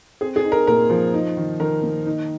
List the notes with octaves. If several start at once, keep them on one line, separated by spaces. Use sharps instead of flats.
C4 G#4
G#4
D#4
A#4
A#2 A#4
F3
D#4
D#3
D#3 A#4
A#3
D#4